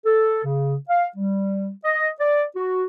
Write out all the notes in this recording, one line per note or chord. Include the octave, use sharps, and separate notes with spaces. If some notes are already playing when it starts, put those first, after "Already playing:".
A4
C#3
F5
G3
D#5
D5
F#4